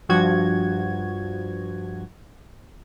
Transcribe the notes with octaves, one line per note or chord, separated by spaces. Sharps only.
G2 F3 F#4 G#6